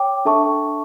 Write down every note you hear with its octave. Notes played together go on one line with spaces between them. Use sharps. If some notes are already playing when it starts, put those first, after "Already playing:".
Already playing: C#5 G5 D6
D4 A4 E5 A5 C#6